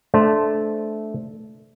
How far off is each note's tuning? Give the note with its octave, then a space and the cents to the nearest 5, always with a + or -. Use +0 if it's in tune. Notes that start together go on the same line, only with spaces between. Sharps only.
A3 -15 D4 +0 C5 +0